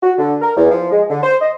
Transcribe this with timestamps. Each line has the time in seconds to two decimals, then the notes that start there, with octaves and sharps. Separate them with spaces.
0.03 F#4
0.18 D3
0.42 A#4
0.57 E2
0.71 F3
0.92 G#3
1.10 D3
1.23 C5
1.41 D#5